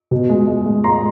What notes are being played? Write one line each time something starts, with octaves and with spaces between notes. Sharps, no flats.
B2
G#3
G#3
G#3
G#3 A#5 C6